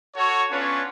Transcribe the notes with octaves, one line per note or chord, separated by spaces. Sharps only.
F#4 A4 C#5
B3 C#4 D4 F4 B4 C#5